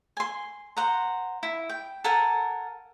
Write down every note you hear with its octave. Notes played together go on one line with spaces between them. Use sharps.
G#5 C6
C5 F#5 A#5
E4
G5
A4 A#4 F#5 G#5